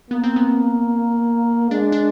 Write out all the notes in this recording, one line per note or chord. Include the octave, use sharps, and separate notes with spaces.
A#3 B3
C4
B3
G#3 D4
D4